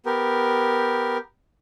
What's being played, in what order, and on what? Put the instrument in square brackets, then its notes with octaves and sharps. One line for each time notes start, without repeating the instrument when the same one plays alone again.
[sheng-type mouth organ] B3 G4 A#4